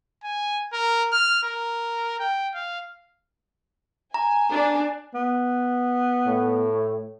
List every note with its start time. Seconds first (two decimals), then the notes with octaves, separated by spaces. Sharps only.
0.24 G#5
0.73 A#4
1.12 F6
1.43 A#4
2.19 G5
2.54 F5
4.14 G#5 A#5
4.52 D4
5.14 B3
6.25 A2